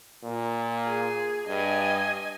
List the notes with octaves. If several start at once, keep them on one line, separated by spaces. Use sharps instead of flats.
A#2
G#4
G2 D#5 G#5